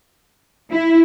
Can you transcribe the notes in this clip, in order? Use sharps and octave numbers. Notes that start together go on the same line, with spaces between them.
E4